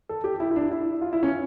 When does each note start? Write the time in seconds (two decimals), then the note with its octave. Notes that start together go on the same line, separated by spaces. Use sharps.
0.09 A4
0.24 G4
0.40 E4
0.51 E4
0.56 D4
0.71 E4
1.01 F4
1.13 E4
1.23 C#4